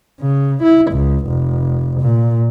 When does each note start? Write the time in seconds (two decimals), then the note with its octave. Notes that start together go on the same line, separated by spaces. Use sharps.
0.21 C#3
0.63 E4
0.91 C#2
1.27 F1
2.01 A#2